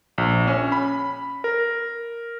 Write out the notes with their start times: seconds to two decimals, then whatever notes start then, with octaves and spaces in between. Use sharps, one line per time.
0.18 A#1
0.47 C#4
0.72 B5
1.44 A#4